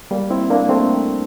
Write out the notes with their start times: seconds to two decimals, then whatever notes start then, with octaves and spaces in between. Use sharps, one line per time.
0.11 G3 A#3
0.30 C4 E4
0.50 A#3 D4
0.69 A3 C4